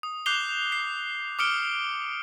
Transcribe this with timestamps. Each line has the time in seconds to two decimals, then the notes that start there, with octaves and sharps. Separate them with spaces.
0.03 D#6
0.26 D6 F#6 G6 C7 F7 G7
0.72 C7
1.39 D6 D#6 F6 C#7 D7 G7